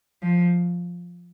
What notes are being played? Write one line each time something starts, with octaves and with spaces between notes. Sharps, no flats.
F3